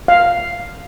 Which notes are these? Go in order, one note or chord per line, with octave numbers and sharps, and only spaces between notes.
F5